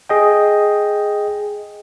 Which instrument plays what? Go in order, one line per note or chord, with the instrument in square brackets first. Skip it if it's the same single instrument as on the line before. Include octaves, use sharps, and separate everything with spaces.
[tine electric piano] G#4 D#5 G5